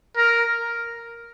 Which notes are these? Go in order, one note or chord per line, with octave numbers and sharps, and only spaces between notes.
A#4